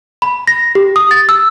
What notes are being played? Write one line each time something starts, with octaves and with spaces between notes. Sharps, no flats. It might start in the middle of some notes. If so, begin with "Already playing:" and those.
B5
A#6
G4
D#6
A6
E6